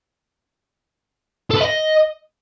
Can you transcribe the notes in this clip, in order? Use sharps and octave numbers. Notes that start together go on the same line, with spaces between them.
A4
B4
D#5